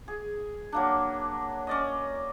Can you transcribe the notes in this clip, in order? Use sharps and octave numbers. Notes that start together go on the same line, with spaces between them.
G#4
F#3 A#3 D4
C#4 D5 D#5